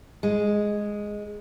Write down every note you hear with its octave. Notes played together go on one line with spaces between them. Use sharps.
G#3